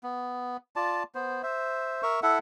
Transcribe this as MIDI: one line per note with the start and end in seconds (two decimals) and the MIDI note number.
0.03 0.57 59
0.76 1.03 65
0.76 1.03 74
0.76 1.03 81
1.15 1.42 59
1.15 1.42 72
1.43 2.02 72
1.43 2.02 76
2.03 2.20 70
2.03 2.20 76
2.03 2.20 85
2.23 2.39 64
2.23 2.39 69
2.23 2.39 76
2.23 2.39 78